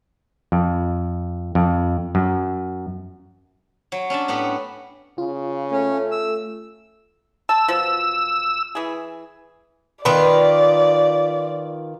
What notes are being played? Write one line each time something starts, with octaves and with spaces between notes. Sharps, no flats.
F2
F2
F#2
F#3
C#4 D4 E5 A5
A2 B3 G4 B4
C#3 F4
A3 C#4
E6
A5 E6
B2 F3
E3 G#4
D#3 F4 B4 D5